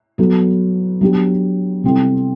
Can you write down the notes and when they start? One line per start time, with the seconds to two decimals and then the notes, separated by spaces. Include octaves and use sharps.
0.18 F#3 B3 F#4 A4
1.01 F#3 B3 D4 G4
1.84 C3 G3 C4 E4 A4